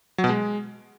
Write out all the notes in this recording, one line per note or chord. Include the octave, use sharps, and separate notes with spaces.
F#3
B2
G#3